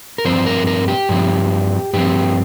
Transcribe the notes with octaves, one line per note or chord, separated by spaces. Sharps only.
A#4
G2 F3 C4 C5
A#4
A#4
G4
G2 F3 C4
G2 F3 C4 G4